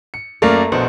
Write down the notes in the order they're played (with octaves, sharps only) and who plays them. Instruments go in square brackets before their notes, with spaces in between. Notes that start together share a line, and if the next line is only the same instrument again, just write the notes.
[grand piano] C#7
[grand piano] F#2 A#3 D5 [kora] A3 A#4 F5
[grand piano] A#1 B2 C5 [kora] F#5